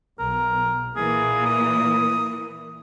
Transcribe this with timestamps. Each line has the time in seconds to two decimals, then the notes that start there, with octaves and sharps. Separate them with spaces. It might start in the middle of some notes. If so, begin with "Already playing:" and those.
0.19 B1 A#4
0.96 A#2 E3 A#3 G#4
1.46 D#6